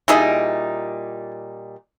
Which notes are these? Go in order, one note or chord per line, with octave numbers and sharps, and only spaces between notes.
A#2 G3 D#4 E4 G#4 D#5